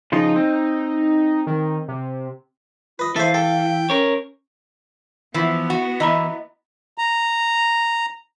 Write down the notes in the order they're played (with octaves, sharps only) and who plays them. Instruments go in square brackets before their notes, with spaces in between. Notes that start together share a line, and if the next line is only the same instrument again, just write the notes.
[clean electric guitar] C#3 F3 F4 [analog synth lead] D#4
[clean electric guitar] C4
[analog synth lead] D#3
C3
[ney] F4 [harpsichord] B4 D#5
[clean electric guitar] E3 [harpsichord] A4 C5 [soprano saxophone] E5 [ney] F5
[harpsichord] A4 [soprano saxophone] G5
[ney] C#4 [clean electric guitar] A#4 C#5
[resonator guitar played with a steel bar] E3 F3 [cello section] B3
[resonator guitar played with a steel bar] F#4
[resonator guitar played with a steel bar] E3 [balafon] D#5 A#5 B5
[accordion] A#5